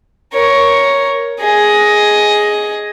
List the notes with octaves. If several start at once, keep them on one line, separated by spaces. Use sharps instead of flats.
A#4 C#5
G#4 D#5